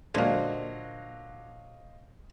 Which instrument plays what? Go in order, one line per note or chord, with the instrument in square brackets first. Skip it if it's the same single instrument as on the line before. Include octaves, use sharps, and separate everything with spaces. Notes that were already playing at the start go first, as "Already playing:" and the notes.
[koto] A#2 [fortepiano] D3 F#3 [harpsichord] G#3 A#3 [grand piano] C5 D#5 F5